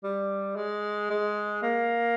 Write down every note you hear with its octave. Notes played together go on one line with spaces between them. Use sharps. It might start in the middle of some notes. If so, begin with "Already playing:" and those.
G3
G#3
G#3
A#3